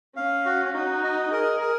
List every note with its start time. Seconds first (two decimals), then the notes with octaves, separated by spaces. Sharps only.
0.16 C#4 F5
0.45 F#4
0.74 D#4 F#4
1.03 D#5
1.31 G#4 A#4
1.60 A#4